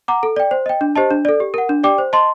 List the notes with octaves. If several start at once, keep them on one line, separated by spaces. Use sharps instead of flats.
F#5 A#5 D6
A4
D5 G5
C5
D#5 G5
D4
G4 C5 D#5 A5
D4
A4 D5
G4
A#4 F#5
D4
G4 D5 G5 D6
C5
D#5 A5 C6